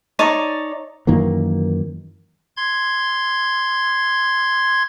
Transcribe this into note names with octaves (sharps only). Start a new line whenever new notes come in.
D#4 C#5 D5 A5
F#2 D#3 E3 A#3
C6 G#6